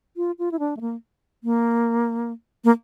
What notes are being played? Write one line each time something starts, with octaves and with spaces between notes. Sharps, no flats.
F4
F4
E4
D4
A3
A#3
A#3
A#3